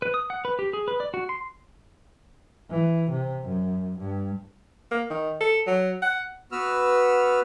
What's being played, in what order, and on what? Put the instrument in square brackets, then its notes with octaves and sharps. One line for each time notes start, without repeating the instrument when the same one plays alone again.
[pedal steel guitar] B4
D#6
F#5
B4
G4
G#4
B4
D5
F#4
C6
[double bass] E3
C3
F#2
G2
[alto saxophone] A#3
D#3
A4
F#3
F#5
[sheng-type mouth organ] B3 F#4 B4 E6 F6